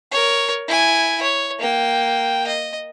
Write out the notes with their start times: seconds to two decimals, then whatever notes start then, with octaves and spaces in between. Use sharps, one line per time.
0.11 A#4 C#5
0.67 E4 G#5
1.22 C#5
1.60 A#3 G5
2.47 D#5